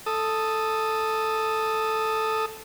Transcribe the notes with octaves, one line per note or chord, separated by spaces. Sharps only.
A4 D#6